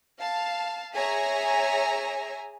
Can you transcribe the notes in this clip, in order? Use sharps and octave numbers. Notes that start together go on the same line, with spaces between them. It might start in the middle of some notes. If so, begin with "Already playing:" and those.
F5 A5
G#4 C#5 E5 G#5 A#5